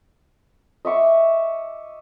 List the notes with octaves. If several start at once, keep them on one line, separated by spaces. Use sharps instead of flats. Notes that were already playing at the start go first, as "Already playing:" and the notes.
D#5 E5 C#6 D6